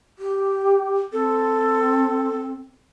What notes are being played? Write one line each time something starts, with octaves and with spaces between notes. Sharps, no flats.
G4
C4 A4